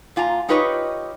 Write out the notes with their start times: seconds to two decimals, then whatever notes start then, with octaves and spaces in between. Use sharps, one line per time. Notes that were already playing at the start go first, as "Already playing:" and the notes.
0.16 A#2 F4 G#5 A#5
0.49 D#4 F4 G4 B4 C#5 D#5